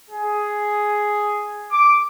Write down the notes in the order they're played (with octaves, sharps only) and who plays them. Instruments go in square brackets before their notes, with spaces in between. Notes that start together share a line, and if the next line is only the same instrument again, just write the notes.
[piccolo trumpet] G#4
D6